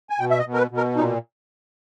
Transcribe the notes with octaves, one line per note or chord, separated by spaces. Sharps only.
G#5
B2 G5
E5
D#5
B2
A#4
B4
B2
A#4
A#2 D#4